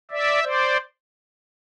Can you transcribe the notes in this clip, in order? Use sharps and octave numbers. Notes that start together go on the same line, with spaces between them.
D5 E5
C5 D5